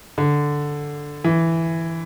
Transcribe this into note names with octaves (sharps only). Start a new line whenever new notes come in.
D3
E3